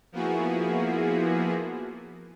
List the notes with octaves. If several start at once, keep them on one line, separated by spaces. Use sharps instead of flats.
F3 A#3 B3 E4 F#4 G#4